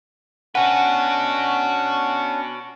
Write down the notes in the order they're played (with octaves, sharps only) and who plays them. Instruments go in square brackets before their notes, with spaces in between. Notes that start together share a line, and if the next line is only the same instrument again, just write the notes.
[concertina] C#4 D4 [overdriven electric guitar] F#4 B4 [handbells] F#5 G#5